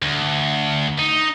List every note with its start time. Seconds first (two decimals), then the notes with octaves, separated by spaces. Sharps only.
0.02 D2
0.99 D#4